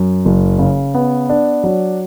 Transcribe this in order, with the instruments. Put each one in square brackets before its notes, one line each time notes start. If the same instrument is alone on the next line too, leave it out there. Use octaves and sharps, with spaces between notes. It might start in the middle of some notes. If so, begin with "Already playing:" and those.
Already playing: [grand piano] F#2
F#1
C#3
B3
D4
F#3